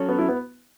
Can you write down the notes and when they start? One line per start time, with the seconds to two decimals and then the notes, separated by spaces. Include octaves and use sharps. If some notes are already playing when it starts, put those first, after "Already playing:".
Already playing: F#3 C#4 A4 C#5
0.09 B3
0.18 E4
0.29 B3